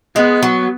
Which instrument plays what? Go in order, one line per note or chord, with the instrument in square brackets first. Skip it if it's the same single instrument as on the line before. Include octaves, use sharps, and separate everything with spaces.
[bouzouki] G#3 [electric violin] B3
[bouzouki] F#3